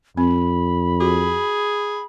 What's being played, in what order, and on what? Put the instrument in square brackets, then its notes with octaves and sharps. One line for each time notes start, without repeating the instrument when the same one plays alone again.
[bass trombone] F2 [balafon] C4 [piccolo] B5
[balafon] F#4 [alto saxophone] G#4